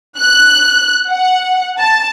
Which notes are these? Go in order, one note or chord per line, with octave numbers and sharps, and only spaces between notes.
F#6
F#5
A5